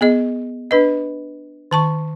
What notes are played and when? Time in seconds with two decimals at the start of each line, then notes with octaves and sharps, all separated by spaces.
0.01 B3 G#4 D#5
0.71 D4 B4 D#5
1.71 D#3 A5 C#6